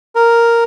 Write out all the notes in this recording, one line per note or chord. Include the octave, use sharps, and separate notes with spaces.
A#4